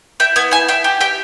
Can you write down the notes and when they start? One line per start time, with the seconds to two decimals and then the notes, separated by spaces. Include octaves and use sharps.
0.20 E4 G5
0.36 B3 G#5
0.51 E4 G#5
0.68 E4 G5
0.84 G4
1.01 G4 G5